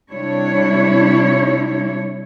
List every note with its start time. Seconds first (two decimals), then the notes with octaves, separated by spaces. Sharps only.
0.11 C3 G3 D4 E4 C#5